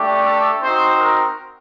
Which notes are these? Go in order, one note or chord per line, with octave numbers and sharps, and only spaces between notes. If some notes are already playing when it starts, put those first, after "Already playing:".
Already playing: A3 D4 G4
A4
C4 D#4 F#4 C5
A#4